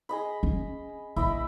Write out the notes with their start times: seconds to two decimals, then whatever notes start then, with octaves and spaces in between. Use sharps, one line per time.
0.09 G#4 D#5 B5
0.43 C#4
1.16 A#1 E4 D#5 B5